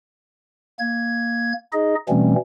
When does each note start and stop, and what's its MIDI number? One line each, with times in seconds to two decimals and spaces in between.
0.79 1.53 58
0.79 1.53 92
1.72 1.95 63
1.72 1.95 68
1.72 1.95 75
2.09 2.35 47
2.09 2.35 52
2.09 2.35 55
2.09 2.35 57
2.09 2.35 60
2.09 2.35 61